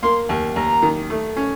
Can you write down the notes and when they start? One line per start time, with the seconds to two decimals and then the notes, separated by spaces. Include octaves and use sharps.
0.03 A#3 C6
0.29 D#2
0.56 D#2 A#5
0.83 D#3
1.10 A3
1.37 C#4